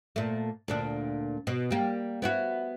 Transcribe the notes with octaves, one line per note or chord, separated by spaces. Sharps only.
A#2 A3
D2 A#2 D4
B2
G3 A#3
B3 E4 F#4